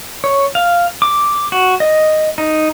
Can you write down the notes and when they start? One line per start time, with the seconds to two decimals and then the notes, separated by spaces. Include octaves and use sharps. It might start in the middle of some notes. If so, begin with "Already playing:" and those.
0.24 C#5
0.55 F5
1.02 D6
1.52 F#4
1.80 D#5
2.38 D#4